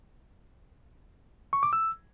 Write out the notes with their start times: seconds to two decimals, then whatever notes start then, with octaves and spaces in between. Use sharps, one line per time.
1.53 C#6
1.63 D6
1.73 E6